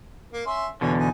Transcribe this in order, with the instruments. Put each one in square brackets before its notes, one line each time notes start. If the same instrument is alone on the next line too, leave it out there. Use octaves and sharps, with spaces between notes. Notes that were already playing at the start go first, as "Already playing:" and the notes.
[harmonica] A#3
C#4 E5 C6
[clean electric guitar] E2 B2 D3 [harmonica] C#5 G#5
[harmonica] D#4 G#5